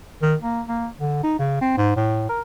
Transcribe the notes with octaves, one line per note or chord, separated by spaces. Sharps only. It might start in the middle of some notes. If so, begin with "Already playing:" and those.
D#3
A#3
A#3
D3
D#4
C#3
C4
G#2
A2
A#4